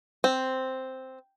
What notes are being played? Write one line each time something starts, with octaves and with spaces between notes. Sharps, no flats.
C4